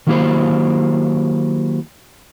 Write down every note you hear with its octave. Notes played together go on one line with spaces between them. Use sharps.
D#3 F#3 A#3 E4 G4 C5